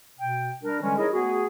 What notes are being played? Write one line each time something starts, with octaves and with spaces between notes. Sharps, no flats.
B2 G5
G3 D4 A#4
D3 E3 G3 G#3 C#4
D#4 E4 G#4 A#4 C#5 D#5
A3 B3 F#4 G#4